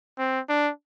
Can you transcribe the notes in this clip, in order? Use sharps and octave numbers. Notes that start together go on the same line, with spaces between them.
C4
D4